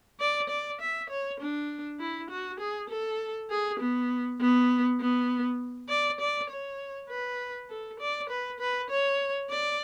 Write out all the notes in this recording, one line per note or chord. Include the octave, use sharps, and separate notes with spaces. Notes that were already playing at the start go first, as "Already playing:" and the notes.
D5
D5
E5
C#5
D4
E4
F#4
G#4
A4
G#4
B3
B3
B3
D5
D5
C#5
B4
A4
D5
B4
B4
C#5
D5